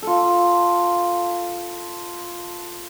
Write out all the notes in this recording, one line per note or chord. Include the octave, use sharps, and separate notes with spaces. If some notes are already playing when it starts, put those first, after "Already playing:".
F4 A4